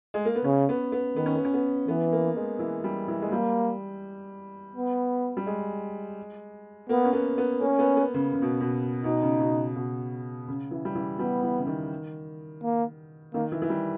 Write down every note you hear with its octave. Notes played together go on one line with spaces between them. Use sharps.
G#3
A#3
B3
C#3 C#4
B3
B3
D#3 B3
C#4
B3
C#4
B3
E3 B3
A#3
G#3
E3
G3
E3
G#3
G3 A#3
B3
G3
G#3
A#3 B3
C#4
B3
B3
A#3 C#4
B3
B3
C#3
C#3
B2
B2
B2 D#4
C#3
B2
B2
C#3
E3
G3
E3
G3 B3
E3
C#3
D#3
A#3
D#3 A#3
E3
E3
G3